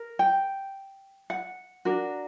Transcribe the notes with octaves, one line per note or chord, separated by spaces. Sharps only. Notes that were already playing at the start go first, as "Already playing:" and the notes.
Already playing: A#4
G5
F#5
D4 F#4 A#4